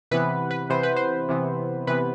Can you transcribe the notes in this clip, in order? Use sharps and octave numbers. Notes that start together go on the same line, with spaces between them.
C3 E3 B3 B4
B4
C3 E3 B3 C5
B4
C5
C3 E3 B3
C3 E3 B3 B4